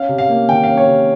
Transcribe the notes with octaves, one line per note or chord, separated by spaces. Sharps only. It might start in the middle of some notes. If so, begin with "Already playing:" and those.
Already playing: C#4 F5
C3
F5
A#3
D#3 G5
C#4 F5
C#5
C3